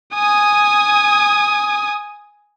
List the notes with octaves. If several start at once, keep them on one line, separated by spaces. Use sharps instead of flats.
G#5 D#6